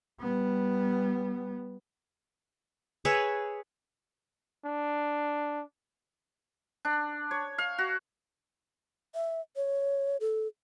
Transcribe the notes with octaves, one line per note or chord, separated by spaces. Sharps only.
G3 B3
G#4 B4 C#5 E5
D4
D4
C#5
F5
F#4
E5
C#5
A4